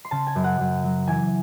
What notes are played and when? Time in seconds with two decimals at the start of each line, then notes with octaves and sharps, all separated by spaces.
0.05 C6
0.11 C#3 A5
0.27 G#5
0.35 F#2
0.44 F#5
0.60 F#2
0.84 F#3
1.07 E3 G#5